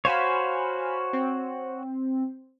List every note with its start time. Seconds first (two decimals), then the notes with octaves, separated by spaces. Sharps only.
0.05 F#4 C5 C#5 F5 G#5 B5
1.13 C4